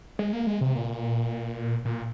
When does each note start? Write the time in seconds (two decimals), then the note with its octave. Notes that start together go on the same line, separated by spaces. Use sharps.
0.19 G#3
0.33 A#3
0.47 G#3
0.61 C3
0.76 A#2
1.85 A#2